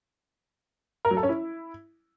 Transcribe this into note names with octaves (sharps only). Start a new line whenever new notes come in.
A#4
F#3
A4
C#4
E4